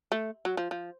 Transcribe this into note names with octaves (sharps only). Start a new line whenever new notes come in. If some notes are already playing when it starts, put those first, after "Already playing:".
A3
F#3
F3
F3